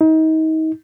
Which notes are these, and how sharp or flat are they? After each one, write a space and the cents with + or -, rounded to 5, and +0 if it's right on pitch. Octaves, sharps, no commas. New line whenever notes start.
D#4 +30